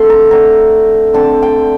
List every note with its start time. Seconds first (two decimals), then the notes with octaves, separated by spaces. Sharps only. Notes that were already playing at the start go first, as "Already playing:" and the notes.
Already playing: D3 A3 C4 C6
0.10 A#5
0.31 D3 A3 C4 A#5
1.14 D3 A3 C4 A5
1.42 G5